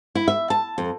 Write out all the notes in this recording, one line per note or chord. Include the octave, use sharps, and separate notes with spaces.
E4
E5
A5
F2